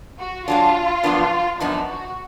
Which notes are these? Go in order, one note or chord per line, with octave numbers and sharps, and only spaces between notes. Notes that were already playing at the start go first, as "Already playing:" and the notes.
F#4
G#2 F#3 D4 F4
F#2 F3 B3 D4
F#2 F3 B3 D4 D#4
F#4